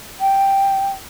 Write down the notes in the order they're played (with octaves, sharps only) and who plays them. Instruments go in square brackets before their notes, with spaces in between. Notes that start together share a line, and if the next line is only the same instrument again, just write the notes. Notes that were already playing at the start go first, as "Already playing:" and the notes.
[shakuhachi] G5